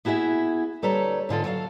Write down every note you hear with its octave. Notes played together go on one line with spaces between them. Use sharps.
B3 E4 F#4 G#4 E5
D2 G3 A4 B4 C#5 A#5
G#2 D3 F4 A4
F#3 A4 C#5 F5